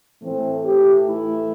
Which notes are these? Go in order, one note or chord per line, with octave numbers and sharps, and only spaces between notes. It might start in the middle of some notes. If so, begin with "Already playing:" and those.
A2 E3 A3 C4
G4
E4